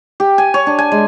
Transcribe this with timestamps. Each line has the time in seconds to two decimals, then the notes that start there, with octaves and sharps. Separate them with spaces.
0.20 G4
0.38 G#5
0.54 C#5
0.67 D4
0.79 G#5
0.92 G#3